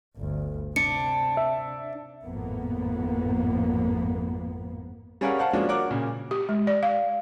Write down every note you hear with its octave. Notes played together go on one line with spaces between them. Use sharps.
G1 D2
C3 D4 C#7
E5
G#1 F2 A2 A#3 B3
G3 C#4 G#4 A#4 F5 F#5
C5 F5 F#5 A5
F3 G#3 A#3 C#4 D4 F#4
F#4 A#4 C#5 F#5 D6
A#2 C#3
G4
G#3
D5
F5